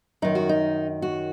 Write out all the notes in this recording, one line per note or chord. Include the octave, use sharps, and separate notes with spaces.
F#2 D#3 D#4
F#4
D#4
F#4